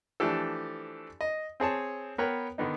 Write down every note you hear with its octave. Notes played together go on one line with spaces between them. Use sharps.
E3 F3 A3 D4 G4 A4
D#5
C4 G#4 C#5 A5
B3 A#4 B4 C#5 G5
D3 D#3 B3 D#4